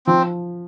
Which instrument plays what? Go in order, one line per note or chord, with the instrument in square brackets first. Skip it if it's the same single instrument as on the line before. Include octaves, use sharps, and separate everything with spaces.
[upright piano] F3 [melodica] C4